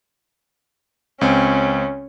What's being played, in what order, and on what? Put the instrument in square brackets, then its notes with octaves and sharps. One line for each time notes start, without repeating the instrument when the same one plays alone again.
[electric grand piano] C#2 C4 [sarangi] C#4